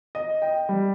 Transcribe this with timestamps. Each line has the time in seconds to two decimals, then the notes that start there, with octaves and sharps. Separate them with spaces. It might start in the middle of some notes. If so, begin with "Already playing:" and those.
0.15 D#5
0.42 G5
0.69 G3